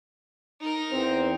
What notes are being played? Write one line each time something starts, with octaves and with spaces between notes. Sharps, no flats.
D#4 A#4
E2 C4 C5